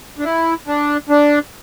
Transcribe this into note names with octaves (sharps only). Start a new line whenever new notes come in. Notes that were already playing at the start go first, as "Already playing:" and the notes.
D4
E4
D4
D4